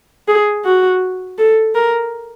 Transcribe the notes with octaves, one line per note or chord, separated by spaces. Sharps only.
G#4
F#4
A4
A#4